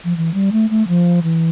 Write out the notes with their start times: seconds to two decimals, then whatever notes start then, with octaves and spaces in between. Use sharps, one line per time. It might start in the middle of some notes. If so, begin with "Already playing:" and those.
0.04 F3
0.17 E3
0.34 G3
0.52 A3
0.70 A3
0.88 F3
1.23 E3